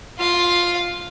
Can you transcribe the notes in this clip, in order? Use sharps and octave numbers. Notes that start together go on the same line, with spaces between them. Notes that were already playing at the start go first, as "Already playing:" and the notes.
F4 F5